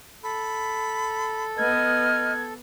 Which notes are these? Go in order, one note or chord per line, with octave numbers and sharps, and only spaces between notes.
A4 B5
B3 D#5 F6 G#6